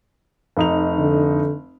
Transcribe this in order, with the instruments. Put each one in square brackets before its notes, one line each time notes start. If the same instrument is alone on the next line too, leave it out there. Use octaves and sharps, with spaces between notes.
[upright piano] F1 D#4 F7
[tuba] D3